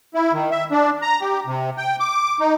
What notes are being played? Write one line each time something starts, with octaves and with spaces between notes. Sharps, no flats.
E4
D#3
E5
D4
A#5
G4
C3
G5
D6
D#4